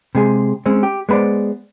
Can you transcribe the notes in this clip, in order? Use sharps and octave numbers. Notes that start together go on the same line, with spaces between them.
C3 G#3 G#4
G#3 C4 C#4
G4
G#3 B3 B4 C5 D5